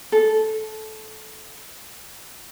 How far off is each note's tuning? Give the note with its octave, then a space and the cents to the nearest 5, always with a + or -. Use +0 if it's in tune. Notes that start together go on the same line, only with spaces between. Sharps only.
A4 -15